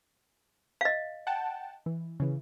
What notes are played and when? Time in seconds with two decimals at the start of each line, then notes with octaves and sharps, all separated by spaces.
0.81 D#5 F5
1.27 F#5 G5 A5
1.86 E3
2.20 C#3 E3